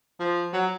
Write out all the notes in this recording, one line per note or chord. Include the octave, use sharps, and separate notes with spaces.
F3
F#3